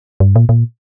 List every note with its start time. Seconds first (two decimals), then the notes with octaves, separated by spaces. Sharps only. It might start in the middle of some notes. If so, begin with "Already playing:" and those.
0.20 G2
0.36 A#2
0.49 A#2